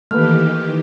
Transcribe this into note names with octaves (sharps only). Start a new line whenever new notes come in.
D#3 E3 A3 A#3 G4 B4 F6